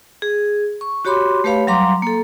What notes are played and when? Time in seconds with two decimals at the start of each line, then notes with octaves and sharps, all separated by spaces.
0.22 G#4
0.81 C#6
1.05 F#4 G4 C#5 B5 C6 D6
1.44 A3 G4 B4 C#5 F5 B5
1.67 F#3 G3 F5 A#5 C6 D6
2.02 A#3 A4